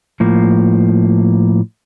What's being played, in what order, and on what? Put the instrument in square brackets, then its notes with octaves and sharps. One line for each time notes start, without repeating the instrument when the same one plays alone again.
[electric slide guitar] A2 F3 A#3